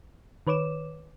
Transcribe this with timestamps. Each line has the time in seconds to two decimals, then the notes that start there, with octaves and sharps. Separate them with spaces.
0.47 D#3 B4 C#5 D6 E7